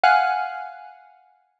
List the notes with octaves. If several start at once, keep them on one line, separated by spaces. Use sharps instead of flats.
F5 F#5 G#5 F6 F#6